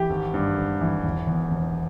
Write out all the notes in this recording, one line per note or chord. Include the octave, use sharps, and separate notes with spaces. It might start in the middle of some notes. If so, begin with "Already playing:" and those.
Already playing: E3 G4
G#1
G2
G#1
E3
E1
E2
E1